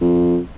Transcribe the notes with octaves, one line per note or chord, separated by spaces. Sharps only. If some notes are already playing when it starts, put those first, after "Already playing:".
F2